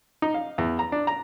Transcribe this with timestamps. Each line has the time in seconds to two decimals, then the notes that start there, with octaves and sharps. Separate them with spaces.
0.22 D#4
0.34 F5
0.58 E2
0.79 A#5
0.92 D4
1.07 A#5